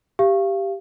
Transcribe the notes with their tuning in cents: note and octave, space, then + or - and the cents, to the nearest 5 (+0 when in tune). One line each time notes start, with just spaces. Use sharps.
G4 +0 F5 -25